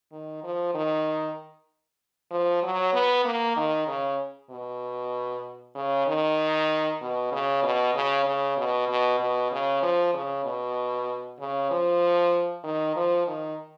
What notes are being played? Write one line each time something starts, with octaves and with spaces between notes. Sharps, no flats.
D#3
F3
D#3
F3
F#3
B3
A#3
D#3
C#3
B2
C#3
D#3
B2
C#3
B2
C#3
C#3
B2
B2
B2
C#3
F3
C#3
B2
C#3
F3
D#3
F3
D#3